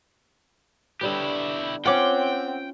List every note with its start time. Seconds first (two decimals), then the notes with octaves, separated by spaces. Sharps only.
1.01 D3 G3 B3 E4 G4
1.86 C4 C#4 F4 F#5 G5 D6